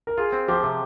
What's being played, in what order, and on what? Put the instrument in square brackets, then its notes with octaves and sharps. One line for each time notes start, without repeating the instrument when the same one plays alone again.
[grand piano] A#4
[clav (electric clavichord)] F4 [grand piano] G#4
[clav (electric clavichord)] C4
[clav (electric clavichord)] F3 [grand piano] G4
[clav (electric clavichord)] C3